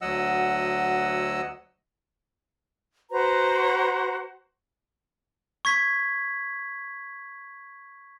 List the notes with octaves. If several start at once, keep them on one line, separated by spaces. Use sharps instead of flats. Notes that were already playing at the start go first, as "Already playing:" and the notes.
D2 F#3 D#5 F#5 E6
F#4 B4 C5 A#5
C#6 G#6 B6